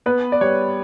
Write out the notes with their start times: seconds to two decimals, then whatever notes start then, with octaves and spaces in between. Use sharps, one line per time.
0.06 B3 B4
0.32 D5
0.41 G3 C#5